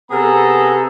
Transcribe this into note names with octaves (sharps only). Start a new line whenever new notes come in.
C3 B3 G#4 A4 A#5